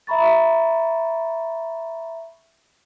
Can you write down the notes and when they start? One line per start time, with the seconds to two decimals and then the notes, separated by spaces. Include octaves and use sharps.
0.07 E5 A#5 B5 C#6 A6